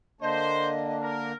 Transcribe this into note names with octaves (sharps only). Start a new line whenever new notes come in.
D3 A#3 D4 C5 D#5
A#4